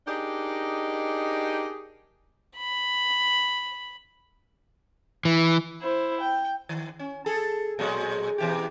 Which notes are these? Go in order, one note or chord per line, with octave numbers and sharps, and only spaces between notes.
D4 D#4 G4 G#4 A#4 D#5
B5
E3
E4 C5
G5
D#3
C#4
G#4 A4
A#2 F#3 G#3
B2 E3 G4